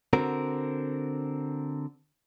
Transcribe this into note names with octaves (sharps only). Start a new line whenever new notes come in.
D3 C4 F#4 A#4